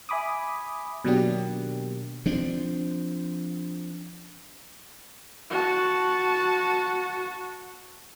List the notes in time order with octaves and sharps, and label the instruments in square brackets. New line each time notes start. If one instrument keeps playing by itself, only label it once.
[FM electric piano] E5 G#5 B5 D6 D#6
B2 D#3 F#3 A#3 D4 G4
[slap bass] F3 C4 D4
[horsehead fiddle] F#4 A5